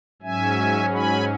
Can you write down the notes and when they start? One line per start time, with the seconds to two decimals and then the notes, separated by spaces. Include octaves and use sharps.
0.22 G#2 F#3 C#4 E5 G#5
0.93 G#5 B5